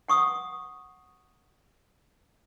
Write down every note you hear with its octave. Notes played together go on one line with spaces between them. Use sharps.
F#5 C#6 D#6